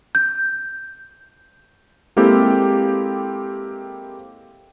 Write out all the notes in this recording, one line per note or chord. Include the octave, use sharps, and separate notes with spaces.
G6
G#3 A#3 C4 E4 G4 A4